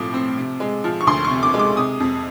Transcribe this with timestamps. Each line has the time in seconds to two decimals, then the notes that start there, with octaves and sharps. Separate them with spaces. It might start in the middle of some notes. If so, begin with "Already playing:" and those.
Already playing: A2 F3 C4 D6 D#6
0.14 C4
0.37 C3
0.60 G#3
0.84 F3
1.01 C#6
1.07 D2 C6
1.25 C#6
1.30 C3
1.43 D6
1.54 G#3
1.59 D6
1.77 C3 D#6
2.00 F2